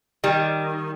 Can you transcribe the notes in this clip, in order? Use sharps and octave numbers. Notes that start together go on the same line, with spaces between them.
D#3 G3